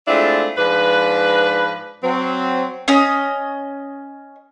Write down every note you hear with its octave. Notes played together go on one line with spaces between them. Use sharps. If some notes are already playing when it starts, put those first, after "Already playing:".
G#3 A3 C4 D4 E4 F4
G#2 F3 D4 B4
F#3 C4
C#4 D#5